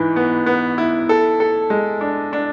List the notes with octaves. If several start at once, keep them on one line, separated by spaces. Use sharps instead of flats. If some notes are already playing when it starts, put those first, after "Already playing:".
Already playing: G#2 E3
B3
B3
E4
A4
A4
G#3
D4
D4